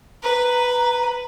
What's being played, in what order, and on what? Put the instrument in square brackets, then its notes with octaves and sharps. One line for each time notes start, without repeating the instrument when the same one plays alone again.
[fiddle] B4 [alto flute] A#5